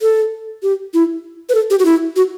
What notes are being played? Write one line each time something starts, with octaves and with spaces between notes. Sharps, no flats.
A4
G4
E4
B4
A4
G4
F#4
E4
F#4